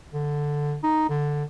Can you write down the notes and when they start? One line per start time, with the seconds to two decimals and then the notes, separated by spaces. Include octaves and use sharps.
0.14 D3
0.83 D#4
1.09 D3